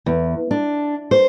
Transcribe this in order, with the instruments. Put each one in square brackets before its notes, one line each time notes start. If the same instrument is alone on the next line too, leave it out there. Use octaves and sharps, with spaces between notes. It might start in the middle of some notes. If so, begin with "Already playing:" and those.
[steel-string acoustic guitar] E2
D4
C5